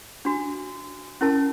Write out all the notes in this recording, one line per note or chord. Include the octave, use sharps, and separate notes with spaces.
D4 F#4
C#4 E4 A#4 A5